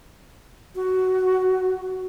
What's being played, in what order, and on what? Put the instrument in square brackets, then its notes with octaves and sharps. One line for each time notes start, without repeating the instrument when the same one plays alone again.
[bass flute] F#4